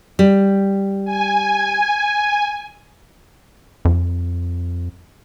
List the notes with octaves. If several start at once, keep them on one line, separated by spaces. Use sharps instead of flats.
G3
G#5
F2